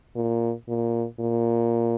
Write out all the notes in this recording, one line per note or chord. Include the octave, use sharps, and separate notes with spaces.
A#2
A#2
A#2